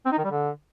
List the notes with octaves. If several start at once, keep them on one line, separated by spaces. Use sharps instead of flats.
C4
D#4
D#3
G3
D3